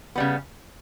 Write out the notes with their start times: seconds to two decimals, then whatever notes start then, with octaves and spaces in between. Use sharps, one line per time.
0.16 C#3 G3 B3